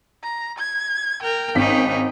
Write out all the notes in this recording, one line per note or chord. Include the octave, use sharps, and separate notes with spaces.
A#5
G#6
A#4 G5
G#1 C#4 D#4 B6